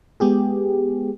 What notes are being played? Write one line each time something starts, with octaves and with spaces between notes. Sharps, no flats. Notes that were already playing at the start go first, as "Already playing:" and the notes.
G#3 B3 G4 G#4